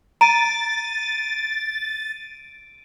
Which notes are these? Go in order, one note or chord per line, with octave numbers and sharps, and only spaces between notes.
A#5 A6 D7 D#7